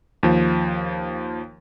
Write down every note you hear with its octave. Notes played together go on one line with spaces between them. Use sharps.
D#2 F3